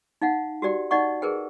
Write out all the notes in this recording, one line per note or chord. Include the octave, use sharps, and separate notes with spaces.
D#4 F5 F#5
F#4 G4 D5 G5
D#4 D5 D#5 F#5 C#6
G#4 A#4 B4 G5